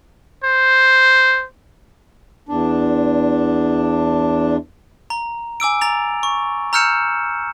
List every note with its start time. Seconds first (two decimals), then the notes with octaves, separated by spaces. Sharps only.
0.44 C5
2.49 E2 D4
5.10 A#5
5.60 G#5 D6 E6 D7
5.81 A#5 A6 F7
6.23 C#6
6.73 A#5 E6 F6 G6 C#7 E7